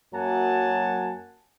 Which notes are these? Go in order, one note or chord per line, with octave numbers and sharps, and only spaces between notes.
F#2 F#3 A#3 F#5 G#5 A5